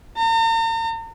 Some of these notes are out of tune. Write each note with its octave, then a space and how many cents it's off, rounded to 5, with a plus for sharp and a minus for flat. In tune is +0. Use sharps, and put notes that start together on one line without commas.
A#5 -45